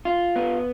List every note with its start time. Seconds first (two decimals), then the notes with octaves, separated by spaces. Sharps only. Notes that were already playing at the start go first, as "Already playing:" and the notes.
0.05 F4
0.36 B3